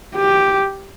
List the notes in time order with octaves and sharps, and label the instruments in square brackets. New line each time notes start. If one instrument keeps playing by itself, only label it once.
[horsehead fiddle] G4